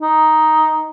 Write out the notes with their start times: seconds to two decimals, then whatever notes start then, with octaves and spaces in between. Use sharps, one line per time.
0.02 D#4